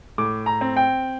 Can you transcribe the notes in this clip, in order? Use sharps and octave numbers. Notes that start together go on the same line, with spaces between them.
A2 D6
A#5
C4
G5